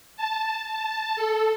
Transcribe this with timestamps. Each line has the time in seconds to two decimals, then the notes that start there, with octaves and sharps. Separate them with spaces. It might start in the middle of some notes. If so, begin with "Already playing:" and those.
0.17 A5
0.71 A5
1.16 A4